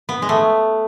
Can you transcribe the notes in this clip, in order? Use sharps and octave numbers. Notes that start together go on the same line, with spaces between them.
B3
G#3
A3